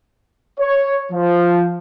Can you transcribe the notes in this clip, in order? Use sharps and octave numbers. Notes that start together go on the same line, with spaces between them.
C#5
F3